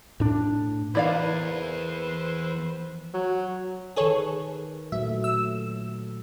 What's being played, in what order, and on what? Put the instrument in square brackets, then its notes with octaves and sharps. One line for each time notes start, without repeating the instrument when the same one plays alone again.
[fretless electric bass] A2 D4
[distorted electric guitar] E2 [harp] E3 A#3 [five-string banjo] E4 D5 F5 [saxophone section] B4 C5
[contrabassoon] F#3
[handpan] D#3 B4 [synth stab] G#4 A4 C#5
[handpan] A#2 F#3 A3 [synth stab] E5
[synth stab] E6